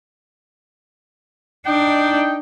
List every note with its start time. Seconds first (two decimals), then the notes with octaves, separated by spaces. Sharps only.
1.66 D4 D#4 G5